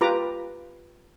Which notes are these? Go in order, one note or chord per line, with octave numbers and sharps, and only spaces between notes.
F4 G4 B4 A#5 D6